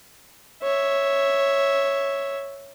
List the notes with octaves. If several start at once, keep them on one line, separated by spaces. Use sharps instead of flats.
C#5 E5